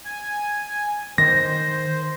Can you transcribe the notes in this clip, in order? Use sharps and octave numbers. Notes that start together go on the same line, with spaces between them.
G#5
D#3 C5 A#6